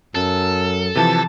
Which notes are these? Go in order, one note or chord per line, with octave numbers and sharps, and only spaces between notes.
F#2 A4
C3 E3 F3 A5